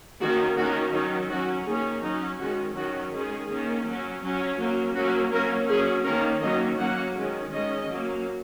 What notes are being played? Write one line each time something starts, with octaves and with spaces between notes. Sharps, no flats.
D#3 A#3 C#4 F#4
D#3 A#3 C#4 F#4
D#3 F#3 C#4 D#4
F#3 C#4 F#4
D#3 A#3 C#4 G#4
F#3 C#4 D#4
D#3 G#3 C#4 F#4
D#3 F#3 C#4 F#4
D#3 G#3 C#4 G#4
D#3 A#3 C#4
F#3 C#4
F#3 C#4
F#3 A#3 C#4
F#3 A#3 C#4 F#4
F#3 A#3 C#4 A#4
F#3 C#4 G#4
D#3 A#3 C#4 A#4
D#3 F#3 A#3 C#4 D#5
F#3 A#3 C#4 F#5
D#3 G#3 C#4
D#3 G#3 C#4 D#5
F#3 A#3 C#4